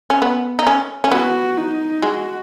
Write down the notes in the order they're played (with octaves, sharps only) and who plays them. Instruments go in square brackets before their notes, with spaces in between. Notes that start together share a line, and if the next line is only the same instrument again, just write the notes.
[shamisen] C#4
B3
D#4
C#4
C#4
[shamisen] B3 [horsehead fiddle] F#4
[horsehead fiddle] D#4
[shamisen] G#3 [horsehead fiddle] F#4